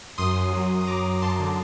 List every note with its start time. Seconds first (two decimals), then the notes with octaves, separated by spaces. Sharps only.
0.18 F#2 C6 D#6
0.36 F#2
0.53 F#3
0.70 F#2
0.81 D#6
0.87 F#2 A#5 D6
1.05 F#2
1.22 F#2 A5 C6
1.39 D3